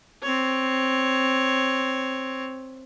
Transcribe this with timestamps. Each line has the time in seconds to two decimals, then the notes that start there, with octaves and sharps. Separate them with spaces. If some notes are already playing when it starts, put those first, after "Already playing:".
0.23 C4 C#5